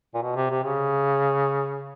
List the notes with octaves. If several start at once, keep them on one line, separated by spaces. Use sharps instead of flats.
A#2
B2
C3
C3
C#3